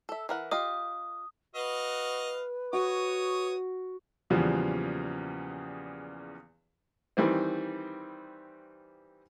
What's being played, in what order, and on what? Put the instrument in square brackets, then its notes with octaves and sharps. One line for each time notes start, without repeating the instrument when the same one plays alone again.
[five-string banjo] A4 E5
E3 A#4 F#5
[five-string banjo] F4 G4 D#5 [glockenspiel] D#6
[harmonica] F#4 D#5 F5 [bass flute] B4
[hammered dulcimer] F#4 [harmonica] C#5 D#6
[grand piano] E2 A#2 C#3 E3 F3 G3
[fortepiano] D#3 E3 G3 C4